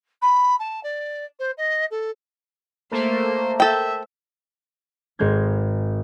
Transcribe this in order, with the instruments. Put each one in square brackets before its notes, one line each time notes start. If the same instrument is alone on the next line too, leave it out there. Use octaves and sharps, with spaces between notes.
[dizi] B5
A5
D5
C5
D#5
A4
[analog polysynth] A3 A#3 [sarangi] C5
[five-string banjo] A4 G5 [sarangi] E5
[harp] G#1 G#2 G#3 G6 G#6